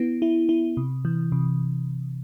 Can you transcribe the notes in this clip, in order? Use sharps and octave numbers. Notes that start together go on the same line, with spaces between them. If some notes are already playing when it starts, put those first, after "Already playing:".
Already playing: B3 E4
E4
E4
C3
E3
C3